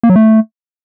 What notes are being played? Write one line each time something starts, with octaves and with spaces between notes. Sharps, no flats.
A#3
F#3
A3